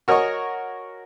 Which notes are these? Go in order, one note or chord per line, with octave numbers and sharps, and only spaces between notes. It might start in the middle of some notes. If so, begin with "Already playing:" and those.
F#4 A#4 C#5 D#5 G#5 C#6